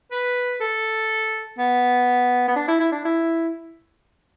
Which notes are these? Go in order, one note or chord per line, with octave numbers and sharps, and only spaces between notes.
B4
A4
B3
B3
D4
E4
E4
D4
E4